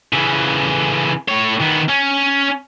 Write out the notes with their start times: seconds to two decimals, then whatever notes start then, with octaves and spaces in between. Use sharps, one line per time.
0.13 C#3 E3
1.28 A2 C#5
1.60 D#3 B3
1.88 C#4